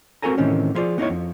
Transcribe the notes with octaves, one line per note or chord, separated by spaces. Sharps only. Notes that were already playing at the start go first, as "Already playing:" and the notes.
C4 F#4 A4 A#4 G#5 A#5
A2 C3 D#3 E3 C#4
F3 E4 F4 G#4 D5
B3 D#4 E4 C#5
F2